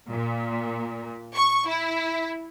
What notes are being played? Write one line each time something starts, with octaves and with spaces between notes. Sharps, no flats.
A#2
C#6
E4